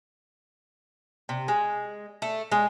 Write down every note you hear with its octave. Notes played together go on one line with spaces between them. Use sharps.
C3
G#3
A3
G#3